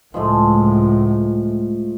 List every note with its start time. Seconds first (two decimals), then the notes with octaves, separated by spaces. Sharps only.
0.14 C#2 A2 F3 G#3 A3